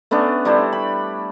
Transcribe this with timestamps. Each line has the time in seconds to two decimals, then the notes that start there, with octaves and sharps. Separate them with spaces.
0.11 A3 B3 C#4 D4
0.45 G3 D4 E4 C5
0.73 B5